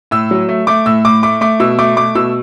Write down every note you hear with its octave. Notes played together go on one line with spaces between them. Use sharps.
A2 E6
F#3
A3
A3 D6
A2 E6
A2 D6
A3 D6
A3 D6
B2 E6
A3 D6
A3 D6
B2 E6